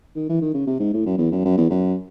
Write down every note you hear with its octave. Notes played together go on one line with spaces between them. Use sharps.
D#3
E3
D#3
C#3
C3
G#2
A2
F#2
E2
F#2
F#2
E2
F#2